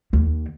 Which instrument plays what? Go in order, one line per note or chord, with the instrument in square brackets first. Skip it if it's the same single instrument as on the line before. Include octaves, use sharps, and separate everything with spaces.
[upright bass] D#2